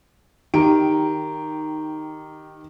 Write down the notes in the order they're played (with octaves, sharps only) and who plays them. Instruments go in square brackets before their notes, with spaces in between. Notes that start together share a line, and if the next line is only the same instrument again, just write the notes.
[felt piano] D#3 G4 D7 [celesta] D#4 A#5